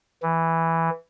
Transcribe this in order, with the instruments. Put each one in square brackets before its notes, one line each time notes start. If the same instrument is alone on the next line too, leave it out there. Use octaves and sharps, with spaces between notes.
[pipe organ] E3